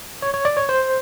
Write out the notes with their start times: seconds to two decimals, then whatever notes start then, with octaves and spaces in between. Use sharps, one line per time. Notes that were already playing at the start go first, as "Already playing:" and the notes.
0.22 C#5
0.34 C#5
0.45 D5
0.57 C#5
0.69 C5